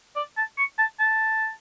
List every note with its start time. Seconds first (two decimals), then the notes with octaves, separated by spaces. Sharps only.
0.16 D5
0.37 A5
0.58 C#6
0.79 A5
1.00 A5